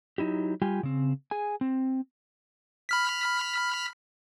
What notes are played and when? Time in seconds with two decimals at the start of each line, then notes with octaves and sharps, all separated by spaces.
0.18 F#3 D#4 E4 G4
0.62 G3 F4 G4 G5 G#5
0.83 C#3 C4
1.31 G#4 G#5
1.61 C4
2.89 B5 F6 B6